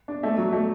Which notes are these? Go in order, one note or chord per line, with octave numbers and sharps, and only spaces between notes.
D4
A3 E5
F#3
A3